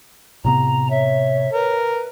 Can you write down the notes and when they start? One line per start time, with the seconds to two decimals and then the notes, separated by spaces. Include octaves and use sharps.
0.44 A2 C3 B3 A#5
0.90 C#5 E5
1.53 A#4 B4